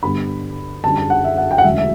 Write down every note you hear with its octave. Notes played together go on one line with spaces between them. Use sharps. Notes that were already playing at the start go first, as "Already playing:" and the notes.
G2 D3 G3 B3 B5
F#2 D3 G3 D4 A5
A5
F#5
E5
F#5
G5
F#5
E1 D2 C#3 F#3 E5
E5